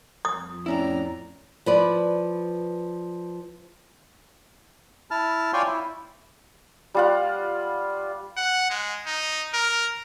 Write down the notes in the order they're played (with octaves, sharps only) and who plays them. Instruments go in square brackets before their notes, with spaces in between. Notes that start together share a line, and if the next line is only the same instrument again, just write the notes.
[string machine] F2 [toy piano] D#6
[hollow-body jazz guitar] A2 C#4 E4 [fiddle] D5 A#5
[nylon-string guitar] F3 B4 D5
[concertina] E4 A5 F6
F4 C#5 D5 G5 G#5 C6
E4
[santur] G3 F4 F#5
[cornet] F#5
G#3
D#4
A#4